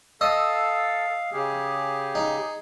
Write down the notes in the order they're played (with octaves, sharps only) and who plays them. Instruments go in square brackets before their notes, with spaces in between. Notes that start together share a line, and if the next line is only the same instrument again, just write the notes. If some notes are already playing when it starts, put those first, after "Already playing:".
[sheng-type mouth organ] A4 [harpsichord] D#5 [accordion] F5 [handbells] D#6 E6
[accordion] C#3 G4 [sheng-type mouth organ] G#4
[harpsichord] D#4